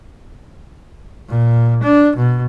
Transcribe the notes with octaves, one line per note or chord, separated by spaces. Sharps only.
A#2
D4
B2